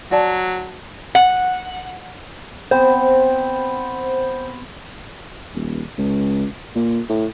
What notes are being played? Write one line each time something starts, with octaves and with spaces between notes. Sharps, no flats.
F#3 F#4 D5 A5
F#5
B3 C4 C5
D#1
C#2
A#2
A2